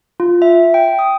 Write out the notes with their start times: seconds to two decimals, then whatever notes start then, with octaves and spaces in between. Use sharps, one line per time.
0.20 F4
0.42 E5
0.74 G5
0.99 D#6